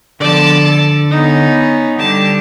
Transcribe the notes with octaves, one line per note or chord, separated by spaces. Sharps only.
D3 F3 B3 D5 A5
A4
B3 C#4 D#4
D3 G3 G4 A5